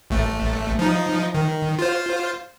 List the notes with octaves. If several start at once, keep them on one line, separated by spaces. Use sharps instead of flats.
A1 A3
F3 D#4
D#3
F4 C5